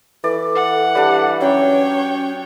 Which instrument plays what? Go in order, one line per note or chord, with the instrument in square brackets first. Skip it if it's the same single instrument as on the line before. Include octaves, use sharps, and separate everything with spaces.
[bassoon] E3 [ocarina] A4 [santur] D5
[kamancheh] F#5
[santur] G3 D4
[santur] F#3 [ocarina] C#4 [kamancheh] C#5 G5